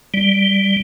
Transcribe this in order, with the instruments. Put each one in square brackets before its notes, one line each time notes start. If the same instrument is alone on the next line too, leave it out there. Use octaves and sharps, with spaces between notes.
[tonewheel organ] G3